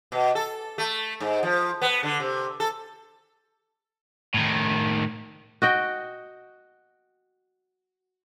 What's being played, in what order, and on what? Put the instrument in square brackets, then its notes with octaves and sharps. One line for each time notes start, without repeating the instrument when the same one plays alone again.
[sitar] B2
A4
A3
G#2
F3
B3
D3
C3
A4
[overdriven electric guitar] A2 D#3
[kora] F#4 D#5 G5